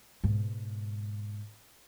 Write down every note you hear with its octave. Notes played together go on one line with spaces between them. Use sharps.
G#2 B2